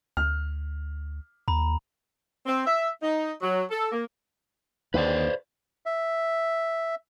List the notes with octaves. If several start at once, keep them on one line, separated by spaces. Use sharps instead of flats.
D2 F6
D#2 A#5 B5
C4
E5
D#4
F#3
A4
A#3
D#2 D3 B4 C5 D5
E5